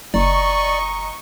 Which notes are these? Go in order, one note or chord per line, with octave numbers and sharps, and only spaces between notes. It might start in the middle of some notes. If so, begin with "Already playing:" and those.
F#1 D5 D#5 A#5 C#6